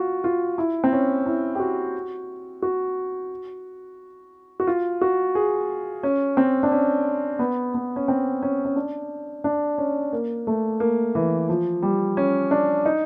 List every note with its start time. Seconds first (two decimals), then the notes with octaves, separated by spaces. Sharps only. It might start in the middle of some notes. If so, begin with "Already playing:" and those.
Already playing: F4 F#4
0.24 F4
0.58 E4
0.84 C4
0.93 C#4
1.26 E4
1.55 G4
1.60 F#4
2.62 F#4
4.60 F#4
4.67 F4
5.02 F#4
5.35 G#4
6.03 C#4
6.37 C4
6.63 D4
6.72 C#4
7.39 B3
7.74 B3
7.96 C#4
8.08 C4
8.42 C#4
8.65 C#4
8.76 D4
9.44 D4
9.78 C#4
10.13 A#3
10.47 A3
10.80 A#3
11.15 E3
11.49 F3
11.82 G3
12.17 C#4
12.51 D4
12.85 D#4